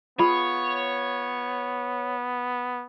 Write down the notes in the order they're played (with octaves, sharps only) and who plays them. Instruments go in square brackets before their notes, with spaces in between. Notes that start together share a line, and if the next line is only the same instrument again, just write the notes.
[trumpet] B3 [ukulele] F4 G#4 B5 [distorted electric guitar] C#5